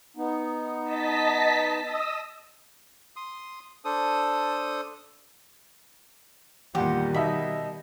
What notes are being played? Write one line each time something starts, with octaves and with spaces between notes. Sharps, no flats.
B3 D#4
D#5 A5 B6
D#5 D#6 E6
C6 D#6
D4 A4 C5 D#6
E2 A#2 D#3 G3 G4 F#5
B2 D#4 D#5 E5 B5